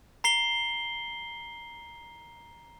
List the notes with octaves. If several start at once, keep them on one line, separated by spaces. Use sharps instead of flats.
A#5 C7 G7